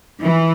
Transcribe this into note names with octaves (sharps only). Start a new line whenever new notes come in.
E3